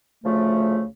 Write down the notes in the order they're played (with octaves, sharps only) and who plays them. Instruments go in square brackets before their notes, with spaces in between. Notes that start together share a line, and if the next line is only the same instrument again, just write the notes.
[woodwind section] D2 C#3 F3 A3